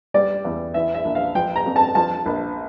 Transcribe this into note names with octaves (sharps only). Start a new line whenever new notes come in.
G3 D5
E2
E3 E5
E5
A#1
F5
F3 G5
A#5
F2
A5
F3 A5
A#1